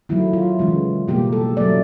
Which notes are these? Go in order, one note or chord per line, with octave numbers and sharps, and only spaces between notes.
D#3 F#3 A3 E4
F4
C#3 E3 G#3
B2 G3 A#3 G4
A4
C#3 F#3 A3 D5